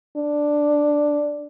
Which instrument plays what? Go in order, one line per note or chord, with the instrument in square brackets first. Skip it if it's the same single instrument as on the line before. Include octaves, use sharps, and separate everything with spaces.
[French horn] D4